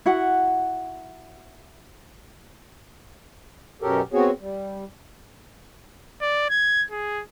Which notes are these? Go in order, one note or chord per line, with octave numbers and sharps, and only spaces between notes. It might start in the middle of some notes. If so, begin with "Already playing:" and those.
E4 F#4 F#5
F#2 B2 C#4 G4 A4 A#4
B3 C4 F#4 G#4 C#5
G3
D5
G#6
G#4